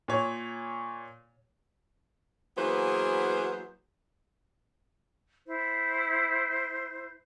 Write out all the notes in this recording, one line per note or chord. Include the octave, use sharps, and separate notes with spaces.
A#2 C#5
E3 F#3 A#3 B3 G#4 C5
E4 C5